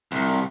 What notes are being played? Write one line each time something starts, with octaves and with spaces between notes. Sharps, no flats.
C2